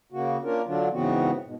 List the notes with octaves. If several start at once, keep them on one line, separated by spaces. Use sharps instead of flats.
C#3 A#3 F#4
A#3 C#4 D4 F4 A#4
D3 F#3 D4 F4
G#2 C#3 E3 B3 C4 F#4
G#2 B2